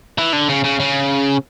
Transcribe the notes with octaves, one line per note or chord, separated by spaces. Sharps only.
E3
D3
C#3
C#3
C#3